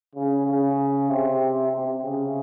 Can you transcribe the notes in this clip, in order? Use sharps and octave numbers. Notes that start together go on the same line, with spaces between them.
C#3
C#3
C3
C3
C#3